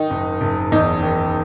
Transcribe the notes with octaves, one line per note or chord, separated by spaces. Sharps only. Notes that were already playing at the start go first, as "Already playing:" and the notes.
Already playing: D#3 D#4
F#1
F#1
E2 D#4
D#3